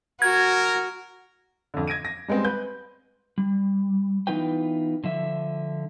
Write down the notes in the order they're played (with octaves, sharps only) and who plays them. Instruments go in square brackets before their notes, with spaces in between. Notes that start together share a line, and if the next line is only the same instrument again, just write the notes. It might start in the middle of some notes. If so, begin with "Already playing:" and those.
[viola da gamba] F#4 [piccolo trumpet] A#4 [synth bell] G#6
[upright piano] F2 D3
G#6 A#6 D7 D#7
A#6
G3 G#3 B3 C4
B4 G6
[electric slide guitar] G3
E3 B3 D#4 F4 B4 G5
D3 F3 E5